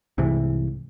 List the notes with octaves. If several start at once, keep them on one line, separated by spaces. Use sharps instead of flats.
C2 G#2 C3 E3